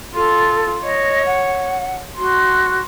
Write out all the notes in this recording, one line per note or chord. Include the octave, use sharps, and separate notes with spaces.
F4 A4
C#5 D#5
F#5
F#4 C6